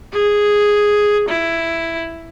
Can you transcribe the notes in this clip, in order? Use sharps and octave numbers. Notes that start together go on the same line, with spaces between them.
G#4
E4